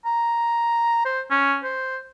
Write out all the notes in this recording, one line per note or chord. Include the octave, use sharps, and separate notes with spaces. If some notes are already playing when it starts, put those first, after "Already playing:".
A#5
C5
C#4
C5